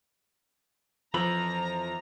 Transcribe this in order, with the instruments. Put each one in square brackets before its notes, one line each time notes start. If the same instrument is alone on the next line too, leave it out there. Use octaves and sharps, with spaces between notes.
[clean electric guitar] F2 E3 B5 [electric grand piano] F3 [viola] A#5